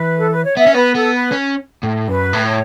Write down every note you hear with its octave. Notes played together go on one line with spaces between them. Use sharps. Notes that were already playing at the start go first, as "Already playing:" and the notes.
Already playing: E3 B4
A4
B4
C#5
B3 E5
C#4
B3 B4
B3 A4
B4
C#4
A2
F#2 B4
A2
C#5